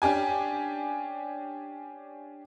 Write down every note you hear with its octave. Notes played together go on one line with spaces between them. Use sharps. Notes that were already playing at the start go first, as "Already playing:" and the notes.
C#4 D4 G4 G#5